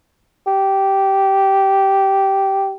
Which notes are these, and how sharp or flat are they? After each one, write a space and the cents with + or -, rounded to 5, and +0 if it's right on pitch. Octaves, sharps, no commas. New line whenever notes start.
G4 -10